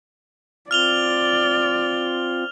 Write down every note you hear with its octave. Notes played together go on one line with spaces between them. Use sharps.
C4 F4 D5 F6 F7 G7